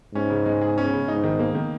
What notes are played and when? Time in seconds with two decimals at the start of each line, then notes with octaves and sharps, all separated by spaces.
0.15 G#2 C#4
0.30 C#3
0.46 G#3
0.61 G#4
0.78 C#4
0.93 C#3
1.08 G#2 D#4
1.24 D#3
1.39 A#3
1.55 D#3